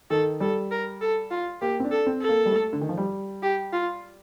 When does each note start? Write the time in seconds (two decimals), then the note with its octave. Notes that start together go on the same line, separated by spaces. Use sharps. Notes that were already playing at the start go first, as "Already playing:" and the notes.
0.10 D#3 A4
0.40 G3 A4
0.71 A#4
1.01 A4
1.31 F4
1.61 A#3 G4
1.80 C4
1.84 D4
1.91 A4
2.06 C4
2.21 A4
2.29 A#3
2.46 G3
2.52 A3
2.73 D3
2.81 D#3
2.89 F3
2.97 G3
3.43 G4
3.73 F4